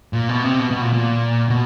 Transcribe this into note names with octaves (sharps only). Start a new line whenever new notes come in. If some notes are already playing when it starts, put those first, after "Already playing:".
A#2
B2
C3
B2
B2
A#2
A#2
B2